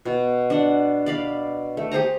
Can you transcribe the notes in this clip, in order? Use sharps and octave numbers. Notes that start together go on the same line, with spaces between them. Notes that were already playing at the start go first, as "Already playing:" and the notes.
B2
D4 F#5
D5 F5 B5
A3
G4 G#4 C5 A#5